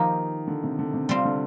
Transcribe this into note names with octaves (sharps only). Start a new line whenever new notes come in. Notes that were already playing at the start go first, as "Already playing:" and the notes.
Already playing: D#3 F3 A#3 D#4 G4
D3
C3
D3
C3
C3 G3 C4 F4
D3